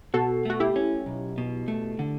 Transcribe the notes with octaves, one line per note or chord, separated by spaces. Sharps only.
B2 F#4 A4
A3 F#4
E4 G4
C#4
B1
B2
A3
D3